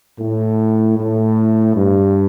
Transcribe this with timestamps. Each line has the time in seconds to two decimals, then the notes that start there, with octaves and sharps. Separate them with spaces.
0.18 A2
0.96 A2
1.76 G2